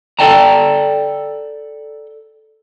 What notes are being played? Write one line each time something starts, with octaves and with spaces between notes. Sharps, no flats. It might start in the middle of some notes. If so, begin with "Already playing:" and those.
A4 B4 D5 G5 A5 A#5